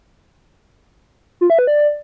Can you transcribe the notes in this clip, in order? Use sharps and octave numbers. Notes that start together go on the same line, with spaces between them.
F4
E5
B4
D5